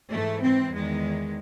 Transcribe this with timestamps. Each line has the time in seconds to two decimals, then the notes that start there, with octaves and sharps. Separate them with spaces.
0.11 G#2 E3 A3
0.41 C4
0.72 E2 D#3 G#3